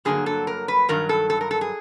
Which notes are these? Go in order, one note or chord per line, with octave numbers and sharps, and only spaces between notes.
G2 D3 F#3 A#3 G#4
A4
A#4
B4
G2 D#3 F#3 A#4
A4
A4
A#4
A4
G#4